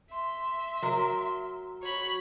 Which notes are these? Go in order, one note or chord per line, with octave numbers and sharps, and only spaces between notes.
E5 C6
F#3 A#4
F#4 C#5 B5